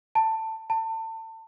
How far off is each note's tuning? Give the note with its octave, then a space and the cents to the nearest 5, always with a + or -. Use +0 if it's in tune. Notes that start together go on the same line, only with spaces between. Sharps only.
A5 +15
A5 +30